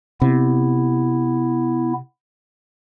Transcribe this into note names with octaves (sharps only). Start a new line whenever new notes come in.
C3 B3 E4